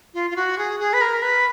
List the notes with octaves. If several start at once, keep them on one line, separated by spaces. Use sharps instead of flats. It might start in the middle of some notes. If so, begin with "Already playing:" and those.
F4
F4
F#4
G#4
G#4
B4
A#4
B4